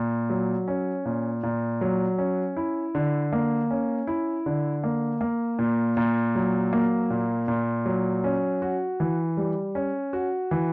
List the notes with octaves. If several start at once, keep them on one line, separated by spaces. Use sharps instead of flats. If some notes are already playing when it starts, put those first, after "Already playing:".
Already playing: A#2
F#3
C#4
A#2
A#2
F#3
C#4
E4
D3
A#3
C#4
E4
D3
A#3
A#3
A#2
A#2
F#3
A#3
A#2
A#2
F#3
C#4
F#4
E3
G3
C#4
F#4
E3